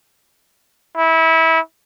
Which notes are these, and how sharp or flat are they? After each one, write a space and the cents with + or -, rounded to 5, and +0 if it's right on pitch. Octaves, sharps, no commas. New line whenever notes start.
E4 -25